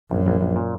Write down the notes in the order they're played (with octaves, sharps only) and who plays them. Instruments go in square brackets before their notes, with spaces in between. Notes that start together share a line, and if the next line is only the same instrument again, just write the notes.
[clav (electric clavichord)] A#1 [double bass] F#2
[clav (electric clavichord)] A#1
A#1
A#2